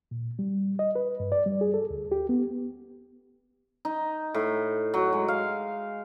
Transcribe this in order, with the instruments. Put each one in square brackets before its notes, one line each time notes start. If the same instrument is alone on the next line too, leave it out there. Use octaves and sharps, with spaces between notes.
[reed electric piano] A#2
G3
D#5
B4
G2
D5
G3
G#4
A4
D2
G4
B3
[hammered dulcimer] D#4
A2
F#3
G#3
F5